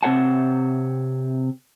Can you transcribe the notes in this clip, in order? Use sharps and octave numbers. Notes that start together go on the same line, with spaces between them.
C3 C4 B4 C#5 F#5 A5